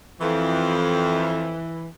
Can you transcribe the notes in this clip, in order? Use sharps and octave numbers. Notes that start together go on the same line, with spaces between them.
F2 E3